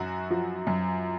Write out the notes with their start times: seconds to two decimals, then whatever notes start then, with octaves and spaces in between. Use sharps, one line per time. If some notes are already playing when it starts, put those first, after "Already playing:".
Already playing: F#2 F#3 F#4
0.30 F3
0.67 F#2